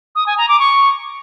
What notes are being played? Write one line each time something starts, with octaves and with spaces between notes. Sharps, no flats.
D#6
G#5
A#5
D6
C#6